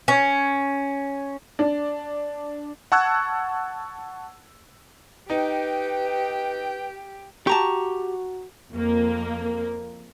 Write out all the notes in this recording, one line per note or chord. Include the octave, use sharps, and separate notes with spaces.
C#4
D4
F#5 A5 C#6 E6 F#6 G#6
D#4 G4 B4 G5
F#4 G4 A5 A#5 C#6
F2 A#3